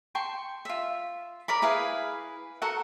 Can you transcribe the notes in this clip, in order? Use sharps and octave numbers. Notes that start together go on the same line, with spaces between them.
G5 A5 C6 C#6
F4 E5
A#4 D5 B5
E4 G#4 B4 F5
F#4 A4 A#4 F#5